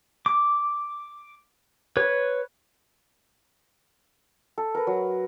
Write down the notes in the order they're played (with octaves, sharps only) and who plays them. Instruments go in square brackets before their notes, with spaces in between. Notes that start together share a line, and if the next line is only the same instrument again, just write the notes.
[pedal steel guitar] D6
B4 C#5
[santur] A4
A#4 B4
F#3